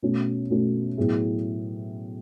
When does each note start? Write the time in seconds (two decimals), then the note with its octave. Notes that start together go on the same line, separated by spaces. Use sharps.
0.03 B2 A3 C#4
0.50 B2 A3 C#4
0.98 A2 F#3 B3 E4 G#4